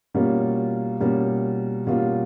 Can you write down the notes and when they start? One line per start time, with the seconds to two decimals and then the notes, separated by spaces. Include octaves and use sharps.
0.14 B2 G3 A#3 C#4 F4
1.00 B2 G3 A#3 C#4 F4
1.87 B2 G3 A#3 C#4 F4